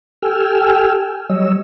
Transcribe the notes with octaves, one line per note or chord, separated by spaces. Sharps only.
G4 A4 G5 G#5 E6 F6
F#3 G3 C#5 D#5 E6